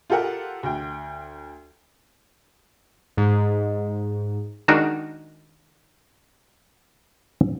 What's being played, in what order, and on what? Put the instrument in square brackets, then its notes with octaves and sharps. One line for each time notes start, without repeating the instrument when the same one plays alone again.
[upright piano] F4 G4 A4 A#4 F#5
D2 G5
[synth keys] G#2
[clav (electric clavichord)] D#3 G#3 D4 D#4 F#4 A#4